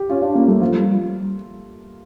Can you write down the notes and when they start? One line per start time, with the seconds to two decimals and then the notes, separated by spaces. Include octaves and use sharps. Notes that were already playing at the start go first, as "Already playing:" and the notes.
Already playing: G4
0.10 C#4 F4
0.22 D4 F4
0.35 A#3 C#4
0.48 G3 A3
0.61 F3 F4
0.78 G3